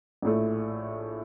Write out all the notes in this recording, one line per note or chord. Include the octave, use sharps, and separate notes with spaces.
A#1 A2 A3